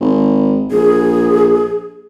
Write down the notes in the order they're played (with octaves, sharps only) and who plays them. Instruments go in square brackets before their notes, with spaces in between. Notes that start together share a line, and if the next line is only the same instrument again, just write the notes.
[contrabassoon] G#1
[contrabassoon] A#1 [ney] G#4